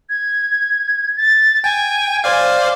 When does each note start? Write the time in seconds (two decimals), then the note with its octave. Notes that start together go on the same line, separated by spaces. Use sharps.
0.10 G#6
1.17 A6
1.64 G5 G#5
2.24 C5 D5 F5